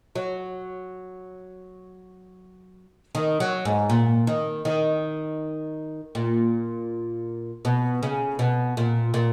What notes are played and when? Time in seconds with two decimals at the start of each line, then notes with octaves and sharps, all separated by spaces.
0.15 F#3
3.15 D#3
3.40 F#3
3.65 G#2
3.90 A#2
4.27 D#3
4.65 D#3
6.15 A#2
7.65 B2
8.03 C#3
8.39 B2
8.77 A#2
9.14 A#2